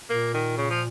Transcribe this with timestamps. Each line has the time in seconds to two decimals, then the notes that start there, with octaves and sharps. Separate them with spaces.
0.10 A#2 A#3
0.34 D#3
0.57 C#3
0.70 F3